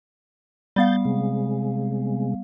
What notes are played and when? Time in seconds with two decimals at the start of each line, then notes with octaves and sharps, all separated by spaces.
0.76 G3 B3 F5 G6 A6
1.05 C3 G#3